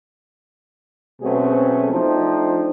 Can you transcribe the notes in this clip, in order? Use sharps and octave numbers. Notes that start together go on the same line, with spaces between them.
B2 F#3 A3 C4 C#4 G#4
F3 A3 C4 D4 D#4